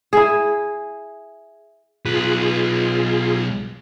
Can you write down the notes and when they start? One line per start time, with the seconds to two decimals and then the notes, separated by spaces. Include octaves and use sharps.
0.13 E4 G#4
2.05 B1 F4 G#4 B4